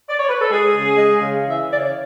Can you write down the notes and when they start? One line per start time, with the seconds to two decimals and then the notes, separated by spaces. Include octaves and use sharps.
0.08 D5
0.19 C#5
0.29 B4
0.39 A4
0.50 G#3 G#4
0.74 C#3
0.97 G#3
1.21 C#3
1.46 E3 E5
1.68 C#3 D5
1.77 C#5